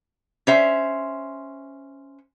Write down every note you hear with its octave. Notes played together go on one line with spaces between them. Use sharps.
C#4 C5 E5